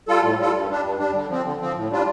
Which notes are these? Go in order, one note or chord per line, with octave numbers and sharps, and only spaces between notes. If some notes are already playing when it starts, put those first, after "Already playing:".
G3 F4 A4
A2
G3 F4 A4
G2
G3 D4
G2
G3 D4
D3
F3 C4
D3
F3 C4
A2
G3 D4 F4